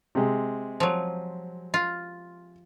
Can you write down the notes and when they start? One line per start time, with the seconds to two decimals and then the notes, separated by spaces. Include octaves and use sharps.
0.15 C3 G#3
0.80 F3 F#3
1.74 F4